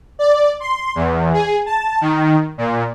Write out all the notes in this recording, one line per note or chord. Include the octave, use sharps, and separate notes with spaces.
D5
C6
E2
G#4
A5
D#3
A#2